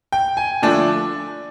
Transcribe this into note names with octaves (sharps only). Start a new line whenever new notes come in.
G5
G#5
D3 F3 A3 D4